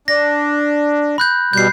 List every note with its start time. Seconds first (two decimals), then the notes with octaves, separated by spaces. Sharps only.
0.08 D4 A#6
1.18 B5 F#6 G6
1.53 B2 G3 G6 C7